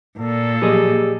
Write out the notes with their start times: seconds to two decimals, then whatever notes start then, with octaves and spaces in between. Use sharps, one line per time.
0.18 A#2 A4
0.62 F3 F#3 A#3 G4 G#4 D#5